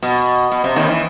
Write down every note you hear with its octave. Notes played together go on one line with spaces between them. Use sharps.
B2
B2
C3
D#2 D#3
E3